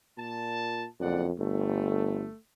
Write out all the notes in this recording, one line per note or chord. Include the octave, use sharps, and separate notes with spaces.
A#2 A5
F#1 F2 D5 F#5
G1 A3